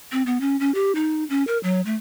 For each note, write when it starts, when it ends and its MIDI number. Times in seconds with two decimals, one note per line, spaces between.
0.12 0.22 60
0.26 0.41 59
0.41 0.58 61
0.60 0.73 61
0.75 0.92 67
0.95 1.24 63
1.30 1.43 61
1.47 1.58 70
1.63 1.81 54
1.86 1.94 57